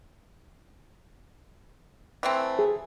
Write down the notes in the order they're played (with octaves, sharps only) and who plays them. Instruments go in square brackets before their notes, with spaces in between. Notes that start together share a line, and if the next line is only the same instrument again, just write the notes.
[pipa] E3 A3 C4
[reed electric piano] G#4